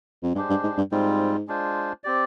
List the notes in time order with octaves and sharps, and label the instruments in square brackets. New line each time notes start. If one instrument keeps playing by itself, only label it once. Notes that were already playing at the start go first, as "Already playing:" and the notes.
[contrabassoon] F2
[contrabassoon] G2 [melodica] G#3 D4 G4 C5
[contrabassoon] G2
G#2
G2
[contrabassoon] G#2 [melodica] G3 C4 F4
[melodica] G#3 D4 F4 C5
C4 G4 D5